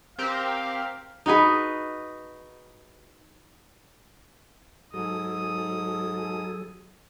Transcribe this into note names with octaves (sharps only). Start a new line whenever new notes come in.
C4 G4 A#4 F5
D#4 F#4 G#4 B4
G#2 F#3 G#4 A4 D#6